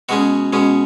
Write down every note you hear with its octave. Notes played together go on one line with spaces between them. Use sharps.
B2 G#3 C#4 F#4
B2 G#3 C#4